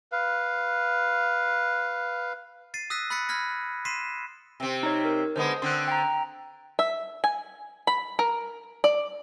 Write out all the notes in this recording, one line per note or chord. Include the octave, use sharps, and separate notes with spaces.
B4 F5
A6 C7 D#7
D#6 E6 F#6 A#6 B6 D#7
B5 F#6 A6 B6 C#7
B5 F6 G#6 A#6
C6 B6 C7 D#7 E7
C3 C4
D#4 C#5
A#4
D3 G#3 B3 C5 D#6
D3 C4 C6 F#6
G5 A#5
E5
G#5
B5
A#4
D5